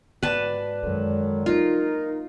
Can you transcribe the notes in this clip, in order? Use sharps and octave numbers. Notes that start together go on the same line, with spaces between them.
G#2 F#4 B4 D5 A5
F#2 D3 D#3 F#3 G#3
A#3 D4 D#4 F4 A#4